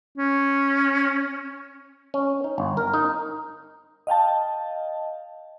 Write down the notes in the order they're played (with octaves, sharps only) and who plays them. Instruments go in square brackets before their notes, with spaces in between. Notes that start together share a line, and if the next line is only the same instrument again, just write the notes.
[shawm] C#4
[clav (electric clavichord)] C#4
D#4
G1
A#4
D#4
[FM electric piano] D#5 F5 G5 A5